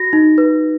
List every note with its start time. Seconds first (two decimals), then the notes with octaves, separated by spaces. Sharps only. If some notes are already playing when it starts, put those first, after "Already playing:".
Already playing: F#4 A#6
0.13 D#4
0.38 B4